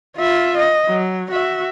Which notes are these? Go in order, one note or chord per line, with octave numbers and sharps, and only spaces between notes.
F4 E5
D#5
F#3
F#4 E5